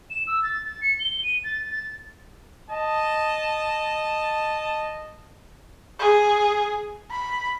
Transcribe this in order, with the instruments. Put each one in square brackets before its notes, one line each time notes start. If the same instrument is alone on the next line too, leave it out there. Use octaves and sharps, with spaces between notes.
[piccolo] E7
E6
A6
A6
C#7
G7
D#7
A6
A6
[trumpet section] D#5 A5
[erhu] G#4
B5